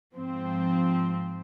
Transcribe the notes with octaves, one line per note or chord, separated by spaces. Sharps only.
G#2 F3 C4